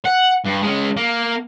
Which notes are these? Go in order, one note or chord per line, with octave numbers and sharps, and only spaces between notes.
F#5
G2
G#3 C#4
A#3